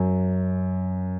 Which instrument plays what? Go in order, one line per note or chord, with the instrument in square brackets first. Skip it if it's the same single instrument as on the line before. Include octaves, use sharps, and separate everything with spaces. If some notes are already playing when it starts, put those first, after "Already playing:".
Already playing: [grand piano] F#2